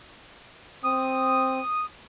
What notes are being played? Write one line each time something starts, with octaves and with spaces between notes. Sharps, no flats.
C4 D#6